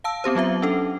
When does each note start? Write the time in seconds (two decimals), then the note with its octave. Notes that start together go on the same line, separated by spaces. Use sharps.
0.04 F5 A5 E6
0.24 B3 C4 G4 C5
0.35 F#3 B3 F4 E5
0.62 C#4 D4 A4